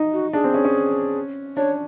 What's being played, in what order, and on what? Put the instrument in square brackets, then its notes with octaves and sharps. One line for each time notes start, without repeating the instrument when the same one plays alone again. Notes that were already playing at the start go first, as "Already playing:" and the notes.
Already playing: [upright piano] D#4
[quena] F#4
[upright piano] D4 [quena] G#4
[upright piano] C4
C#4
C#4
[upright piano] D4 [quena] C#5